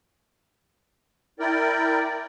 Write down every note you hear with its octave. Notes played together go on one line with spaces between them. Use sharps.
E4 A#4 D5 G5